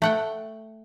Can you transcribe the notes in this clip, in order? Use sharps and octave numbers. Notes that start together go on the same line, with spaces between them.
A3 F#5 G5